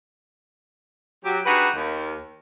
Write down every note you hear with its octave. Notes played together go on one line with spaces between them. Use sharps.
F#3 G4
G3 D4 D#4 F#4 G#4 B4
D#2